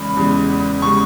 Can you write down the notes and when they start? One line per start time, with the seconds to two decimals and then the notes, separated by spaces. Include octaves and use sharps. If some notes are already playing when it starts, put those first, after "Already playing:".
Already playing: E2 C#3 G#3 B5
0.17 E2 C#3 G#3
0.82 C#3 G#3 C#6